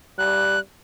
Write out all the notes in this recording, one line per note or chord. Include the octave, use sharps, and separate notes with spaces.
G3 F#6